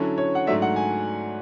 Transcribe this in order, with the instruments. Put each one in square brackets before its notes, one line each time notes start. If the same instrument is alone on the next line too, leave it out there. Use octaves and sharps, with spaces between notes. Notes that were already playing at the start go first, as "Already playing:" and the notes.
Already playing: [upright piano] D3 F#3 C#4 E4 A4
[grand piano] C#5
F#5
[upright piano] G#2 F#3 A3 D4 [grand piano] E5
[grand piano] F#5
G#5